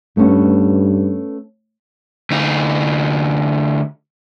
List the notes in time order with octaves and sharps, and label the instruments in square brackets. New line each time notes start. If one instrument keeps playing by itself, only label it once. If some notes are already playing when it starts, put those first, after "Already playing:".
[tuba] G2 [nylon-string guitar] A3 B3 C#4
[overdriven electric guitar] D2 D#4